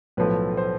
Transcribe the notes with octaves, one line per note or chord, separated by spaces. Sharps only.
B1 A2 F3 A3 B4
C5